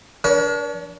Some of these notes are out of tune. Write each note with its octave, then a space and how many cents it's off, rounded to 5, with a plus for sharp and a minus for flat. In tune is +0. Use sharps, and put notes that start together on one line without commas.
D4 -15 A#4 +45 C#5 +35